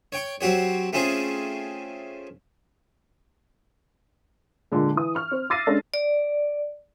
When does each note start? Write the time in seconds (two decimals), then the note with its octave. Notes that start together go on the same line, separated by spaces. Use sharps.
0.12 C#5 G5 C#6
0.41 F#3 C4 F#4 G4 C#5
0.93 A3 C4 C#4 F4 G#4
4.72 A#2 D3 G#3
4.96 E3 D#6
5.15 C#6 F6
5.31 C4
5.50 D6 E6 A6 A#6 C7 D#7
5.67 G#3 C#4 D4 A4
5.94 D5